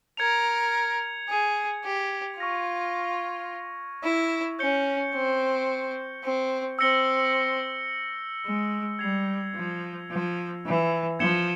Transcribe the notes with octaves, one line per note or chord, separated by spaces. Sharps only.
A#4 G#6 C#7 F7
G#4
G4
F4 C#6 F6 A#6 F7
E4
C#4 G6 C#7 G7
C4
C4
C4 E6 A#6 C#7 G7
G#3
G3 G#6 C7 F7
F3
F3
E3
F3 G#6 C#7 E7 G7